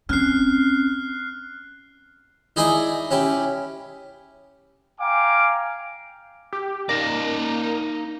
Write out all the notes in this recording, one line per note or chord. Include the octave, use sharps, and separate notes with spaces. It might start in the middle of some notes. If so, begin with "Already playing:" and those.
C4 C#4 F6 F#6 C7
D#4 E4 G#4 D5 D#5
C#4 E4 G4
F5 G5 G#5 A#5 D6
G4
A#3 D#4 D5 A#6